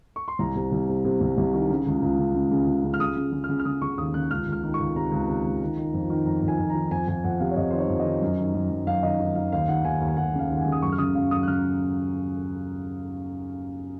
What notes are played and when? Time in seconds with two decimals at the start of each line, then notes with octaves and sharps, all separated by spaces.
0.16 C#6
0.28 C6
0.39 C2 A#5
0.56 C3
0.72 C2
0.88 C3
1.05 C3
1.21 C2
1.37 C2
1.54 D#3
1.70 C#3
1.87 C#2
2.02 C#2
2.19 C#3
2.35 C#3
2.51 C#3
2.68 C#3
2.84 C#3
2.94 F6
3.00 C#3 D#6
3.16 C#3
3.32 C#3
3.44 F6
3.49 C#3
3.59 F6
3.65 C#3 D#6
3.82 C#3 C#6
3.98 D#2 D#6
4.14 C#3 F#6
4.31 C#2 F6
4.47 C#2
4.52 F6
4.63 D#3
4.74 C#6
4.80 C#2
4.96 C3 A#5
5.12 C#2
5.28 C3
5.45 C#2
5.61 D#3
5.77 D#3
5.94 F2
6.10 D#3
6.26 F2 A#5
6.42 F2
6.48 G#5
6.59 F2
6.70 A#5
6.75 D#3
6.91 F2 G#5
7.08 F2 G#5
7.24 F2 F#5
7.40 C3 F5
7.51 C#5
7.57 F2 D#5
7.71 D#3 C5
7.78 C#5
7.89 F2
8.00 D#5
8.05 D#3
8.22 F#2
8.38 D#3
8.54 F#2
8.71 F#2
8.87 F#2 F5
9.03 D#3 D#5
9.20 D#3
9.35 D#3 F5
9.52 D#2 F5
9.68 D#2 F#5
9.84 D#2 G#5
10.01 D#2
10.08 G#5
10.17 D#2 F#5
10.34 C#3
10.39 F5
10.50 D#2
10.57 F#5
10.61 C#3 G#5
10.72 D#6
10.82 F#2 C#6
10.92 F6
10.98 C#3 D#6
11.15 F#2 F5
11.31 F#2 D#6
11.43 F#6
11.48 C#3 F6